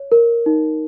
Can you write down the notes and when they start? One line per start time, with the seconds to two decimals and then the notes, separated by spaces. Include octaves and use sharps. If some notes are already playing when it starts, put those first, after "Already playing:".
Already playing: C#5
0.12 A#4
0.46 D#4